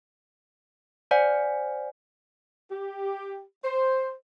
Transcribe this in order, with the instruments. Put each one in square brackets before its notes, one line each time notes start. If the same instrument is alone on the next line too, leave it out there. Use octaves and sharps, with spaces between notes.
[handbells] C5 D5 F#5 G#5
[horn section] G4
C5